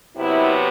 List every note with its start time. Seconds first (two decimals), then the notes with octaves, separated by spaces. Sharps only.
0.17 C3 F#3 B3 E4